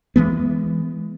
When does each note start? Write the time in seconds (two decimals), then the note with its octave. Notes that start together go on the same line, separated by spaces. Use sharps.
0.16 E3 F#3 G#3 B3